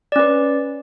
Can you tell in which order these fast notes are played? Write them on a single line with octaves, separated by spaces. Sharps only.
D5 C#4 B4